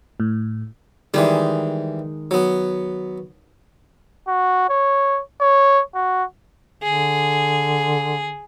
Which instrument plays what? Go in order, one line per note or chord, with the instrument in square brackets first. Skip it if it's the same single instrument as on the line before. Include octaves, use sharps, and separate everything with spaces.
[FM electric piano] A2
[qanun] D#3 G#3 [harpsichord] E3 G3
[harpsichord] F#3 B3
[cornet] F#4
C#5
C#5
F#4
[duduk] D3 [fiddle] G#4